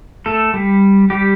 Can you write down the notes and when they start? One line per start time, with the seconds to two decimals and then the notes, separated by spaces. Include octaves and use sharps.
0.26 A3 A4
0.54 G3 G4
1.10 G3 G4